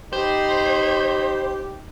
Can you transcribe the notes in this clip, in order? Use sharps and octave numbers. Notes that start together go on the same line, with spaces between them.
D#4 G4 C5 B5